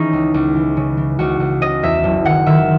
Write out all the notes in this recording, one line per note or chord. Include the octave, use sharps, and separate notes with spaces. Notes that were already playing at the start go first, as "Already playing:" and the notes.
Already playing: E3 C#4 D#4 G#4
C#2
C#2
E3
C#3
E3
C#2 F#4
C#2
C#3 D#5
E2 E5
F#1
D#3 F#5
D#3 E5